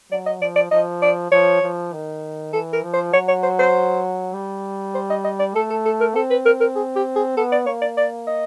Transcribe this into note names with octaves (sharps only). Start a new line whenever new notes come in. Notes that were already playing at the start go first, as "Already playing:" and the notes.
F#3 D5
D#5
F3 D5
D5
F3 D#5
D5
F3 C#5
F3
D#3
E3 A4
A#4
F3
C5
F#3 C#5
C#5
C5
C5
G3
C5
D#5
D#5
D5
A3 A4
A4
A4
A#4
C4 A4
B4
A#4
A#4
G#4
G4
G#4
B3 A4
D5
A#3 C#5
D5
D5
D#5